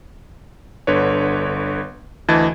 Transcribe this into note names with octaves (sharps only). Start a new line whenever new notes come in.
G1 D3 B4 C#5
D2 E3 D#5 A5 G#6 A6